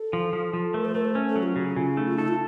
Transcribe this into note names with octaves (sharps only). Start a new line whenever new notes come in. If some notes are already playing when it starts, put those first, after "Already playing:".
Already playing: A4
F3
F3
F3
A3 A#4
C5
A3 A#4
C5
C#4
A4
F#3
F4
C#3 F#4
C#3 F4
A3 D#4
F4
D#4 A4
F4